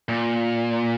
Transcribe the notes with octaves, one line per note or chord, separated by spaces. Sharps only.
A#2